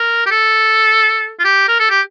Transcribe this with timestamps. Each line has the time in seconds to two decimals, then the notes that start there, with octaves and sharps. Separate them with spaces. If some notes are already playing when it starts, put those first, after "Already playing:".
Already playing: A#4
0.26 G4
0.31 A4
1.39 F4
1.44 G4
1.68 A#4
1.80 A4
1.90 G4